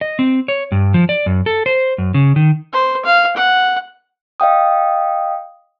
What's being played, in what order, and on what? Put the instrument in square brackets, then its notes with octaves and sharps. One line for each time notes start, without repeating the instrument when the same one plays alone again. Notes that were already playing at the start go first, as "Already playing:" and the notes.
[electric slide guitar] D#5
C4
C#5
G2
F3
D5
F#2
A4
C5
F#2
C#3
D#3
[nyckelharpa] C5
F5
F#5
[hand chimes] D#5 F5 G5 D#6